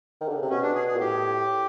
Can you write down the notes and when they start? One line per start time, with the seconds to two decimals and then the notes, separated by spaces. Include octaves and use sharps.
0.21 D#3
0.28 D3
0.36 C#3
0.43 C3
0.50 B2 C#4
0.63 D4
0.75 G#4
0.87 G#4
0.96 A#2
1.00 A2 G4